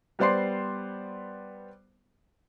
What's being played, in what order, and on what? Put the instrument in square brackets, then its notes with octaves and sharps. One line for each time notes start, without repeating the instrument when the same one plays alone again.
[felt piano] G3 B3 C5 D5 C6 C7